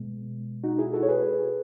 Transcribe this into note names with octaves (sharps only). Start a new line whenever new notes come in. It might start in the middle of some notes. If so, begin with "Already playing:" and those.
Already playing: B2 G#3 B3
D#4 F#4
E4 G#4
F#4 A4
C#5
G#4 B4